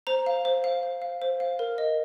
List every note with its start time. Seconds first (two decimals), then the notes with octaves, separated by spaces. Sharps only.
0.07 C5 A#5
0.26 F5
0.45 C5
0.64 F5
0.83 C5
1.02 F5
1.22 C5
1.40 F5
1.59 A#4
1.78 D#5